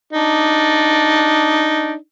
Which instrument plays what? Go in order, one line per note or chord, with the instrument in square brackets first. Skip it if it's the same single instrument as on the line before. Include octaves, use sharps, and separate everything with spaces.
[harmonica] D4 D#4